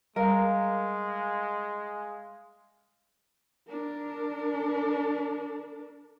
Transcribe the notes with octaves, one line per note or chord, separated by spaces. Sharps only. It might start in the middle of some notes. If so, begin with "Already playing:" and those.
G3 G#3 A#4 F5
D4 A#4